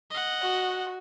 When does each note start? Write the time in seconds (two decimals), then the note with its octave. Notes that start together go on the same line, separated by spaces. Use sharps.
0.11 D#5 F#5
0.41 F#4